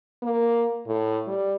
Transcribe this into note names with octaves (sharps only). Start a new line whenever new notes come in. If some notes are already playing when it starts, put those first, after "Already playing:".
A#3
A2
G3